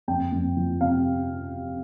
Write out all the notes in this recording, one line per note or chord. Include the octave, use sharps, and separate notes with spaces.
F2 G5
F2
F3
C3 F5